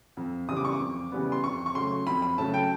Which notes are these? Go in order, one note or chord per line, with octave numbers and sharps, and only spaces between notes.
F2
C#3 E3 G3 B3 D#6
D6
C#6
D6
F2
C#3 E3 G3 B3
C6
F2 C#6
C#6
C#3 F#3 A3 C6
F2 B5
B5
C#3 F#3 A3 A5
G5